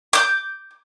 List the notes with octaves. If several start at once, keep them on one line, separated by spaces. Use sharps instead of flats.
D6 G6